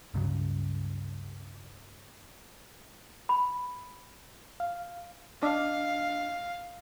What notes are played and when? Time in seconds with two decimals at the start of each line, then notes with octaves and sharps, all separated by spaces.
0.14 C#2 G2 C#3 F#3
3.29 B5
4.60 F5
5.42 D4 D#5 F5